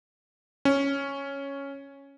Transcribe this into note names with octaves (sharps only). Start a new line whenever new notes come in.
C#4